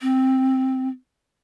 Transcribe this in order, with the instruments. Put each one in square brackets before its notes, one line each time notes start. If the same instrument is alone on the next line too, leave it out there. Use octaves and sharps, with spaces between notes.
[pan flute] C4